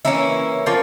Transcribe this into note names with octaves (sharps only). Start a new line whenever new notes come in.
E3 A#3 C#4 E4
F3 A#3 C#4 F4